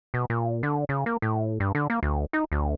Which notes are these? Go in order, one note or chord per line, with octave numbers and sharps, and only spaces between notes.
B2
A#2
D3
C#3
A#3
A2
G2
D3
A#3
D2
D#4
D2